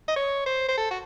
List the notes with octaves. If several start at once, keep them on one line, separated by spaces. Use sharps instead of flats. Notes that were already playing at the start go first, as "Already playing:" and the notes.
D#5
C#5
C5
C5
A4
F#4